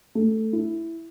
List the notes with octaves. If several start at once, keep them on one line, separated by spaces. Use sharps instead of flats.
A3
E4